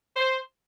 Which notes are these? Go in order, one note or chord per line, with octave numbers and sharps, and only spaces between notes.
C5